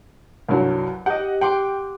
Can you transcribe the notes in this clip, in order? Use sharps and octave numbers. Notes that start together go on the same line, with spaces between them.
C2 G2 F#3
G4 D#5 F#5
F#5 G5 C6 D6